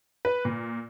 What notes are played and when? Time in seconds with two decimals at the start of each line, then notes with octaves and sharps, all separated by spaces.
0.25 B4
0.45 A#2